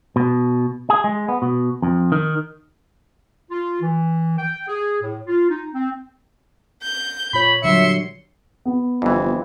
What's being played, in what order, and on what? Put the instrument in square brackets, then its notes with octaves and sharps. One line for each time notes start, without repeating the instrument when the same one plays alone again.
[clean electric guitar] B2
G#4
G#3
B3
B2
F2
D#3
[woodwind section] F4
E3
G5
G#4
A2
F4
D#4
C4
[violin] G6
[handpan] A#2 F4 C#5 [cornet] B5
[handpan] D3 F#3 G3 [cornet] E5 [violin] C6 C#7
[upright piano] B3
[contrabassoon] G1 [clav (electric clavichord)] F2 E3